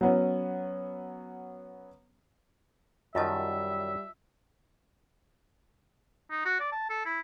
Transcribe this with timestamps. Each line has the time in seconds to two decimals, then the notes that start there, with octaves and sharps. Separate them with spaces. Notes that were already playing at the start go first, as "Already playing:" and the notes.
0.01 F#3 B3 C#4
3.15 F#2 D#3 G3 F4 D#5 E5 A5
6.31 D#4
6.45 F#4
6.60 D5
6.72 A5
6.90 A4
7.05 E4